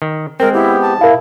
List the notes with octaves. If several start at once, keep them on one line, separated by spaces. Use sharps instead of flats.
D#3
G#3 C4 A#4
B3 E4 G4
A5
E4 A#4 F5